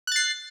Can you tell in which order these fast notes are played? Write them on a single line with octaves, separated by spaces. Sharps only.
F#6 A6 C7